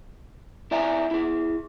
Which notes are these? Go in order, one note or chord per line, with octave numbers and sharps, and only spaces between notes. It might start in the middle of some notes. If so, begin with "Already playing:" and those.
E4 D5 E5 G#5 A#5
E4 G#4